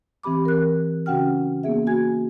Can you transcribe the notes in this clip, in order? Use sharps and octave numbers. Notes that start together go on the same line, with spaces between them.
E3 C4 G4 B5 D6
A#4 F#6
C#3 C#4 F#4 F#5 G5 F6
A#3 B3 G#4 E5
F#4 G#5 G#6